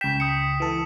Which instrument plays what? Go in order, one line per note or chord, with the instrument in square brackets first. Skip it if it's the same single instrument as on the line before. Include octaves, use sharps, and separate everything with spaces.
[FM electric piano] C#2 G5 [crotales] B6 E7
[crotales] D#6 C#7
[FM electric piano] E3 A4